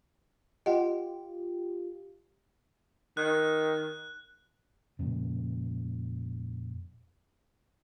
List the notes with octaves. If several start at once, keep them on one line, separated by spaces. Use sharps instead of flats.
F4 G4 D#5 F#5
D#3 F#6
F2 A#2 C#3